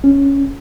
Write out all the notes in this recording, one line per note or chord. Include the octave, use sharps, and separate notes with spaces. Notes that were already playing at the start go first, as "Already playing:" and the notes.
C#4